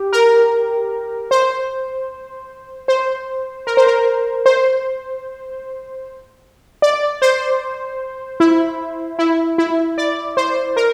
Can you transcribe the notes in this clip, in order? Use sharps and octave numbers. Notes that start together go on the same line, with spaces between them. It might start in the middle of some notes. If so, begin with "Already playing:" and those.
Already playing: G4
A#4
C5
C5
A#4
C5
A#4
C5
D5
C5
E4
E4
E4
D5
C5
A#4